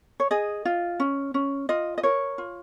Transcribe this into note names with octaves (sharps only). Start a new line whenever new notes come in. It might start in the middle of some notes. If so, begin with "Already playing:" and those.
C#5
G#4 D#5
F4
C#4
C#4
F4 D#5
D#5
A#4 C#5
F4